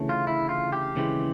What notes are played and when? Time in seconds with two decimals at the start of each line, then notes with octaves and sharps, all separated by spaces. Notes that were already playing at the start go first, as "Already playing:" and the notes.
Already playing: D2 C#3 E3 A3 C#4
0.09 F4
0.27 E4
0.49 F4
0.72 G4
0.95 D#2 C#3 E3 G#3 C4